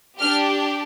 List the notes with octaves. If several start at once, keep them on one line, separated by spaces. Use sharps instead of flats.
D4 G4 F6